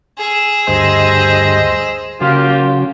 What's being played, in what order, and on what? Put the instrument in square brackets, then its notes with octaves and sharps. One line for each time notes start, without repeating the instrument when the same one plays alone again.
[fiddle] G#4 E6
[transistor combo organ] D2 G2 [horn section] C5 D#5
[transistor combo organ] C#3 F#3 [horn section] A#3 F4 G4